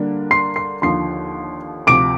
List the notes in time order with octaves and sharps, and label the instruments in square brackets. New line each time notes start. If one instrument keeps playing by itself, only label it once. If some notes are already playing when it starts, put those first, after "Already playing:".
Already playing: [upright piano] D3 G3 A#3 D4
[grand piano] C6 C7
C6 C7
[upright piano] D#2 D3 F3 [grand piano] C6 C7
[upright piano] D2 C3 F3 [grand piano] D6 D7